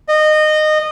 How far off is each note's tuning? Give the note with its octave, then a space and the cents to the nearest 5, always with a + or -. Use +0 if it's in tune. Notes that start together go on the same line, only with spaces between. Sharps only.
D#5 -20